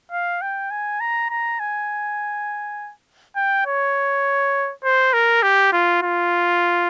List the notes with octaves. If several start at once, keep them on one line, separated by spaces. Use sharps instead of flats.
F5
G5
G#5
A#5
A#5
G#5
G5
C#5
C5
A#4
G4
F4
F4